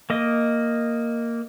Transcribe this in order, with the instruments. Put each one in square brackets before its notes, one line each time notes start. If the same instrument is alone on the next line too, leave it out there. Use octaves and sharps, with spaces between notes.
[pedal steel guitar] A#3 D#5